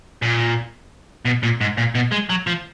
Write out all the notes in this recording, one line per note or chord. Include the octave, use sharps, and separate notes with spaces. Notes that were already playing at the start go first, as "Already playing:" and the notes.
A#2
B2
A#2
G#2
A#2
B2
G#3
F#3
F3